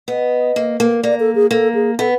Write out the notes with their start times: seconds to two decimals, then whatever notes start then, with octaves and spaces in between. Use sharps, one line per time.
0.08 B3 D#5
0.56 A#3
0.80 A#3
1.03 A#3 D5
1.20 A4
1.35 G#4
1.51 A#3 A4
1.75 G#4
1.99 B3 A4